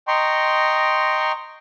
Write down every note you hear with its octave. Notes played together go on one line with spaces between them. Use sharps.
D#5 G5 A#5 C6 C#6